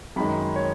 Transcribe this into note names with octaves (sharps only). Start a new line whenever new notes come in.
F#2 D#3 G#3 B5
C#5